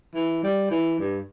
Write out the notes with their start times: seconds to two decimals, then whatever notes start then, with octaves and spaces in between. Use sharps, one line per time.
0.15 E3
0.43 G3
0.71 E3
1.00 G2